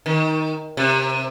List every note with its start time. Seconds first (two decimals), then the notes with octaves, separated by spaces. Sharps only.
0.06 D#3
0.77 C3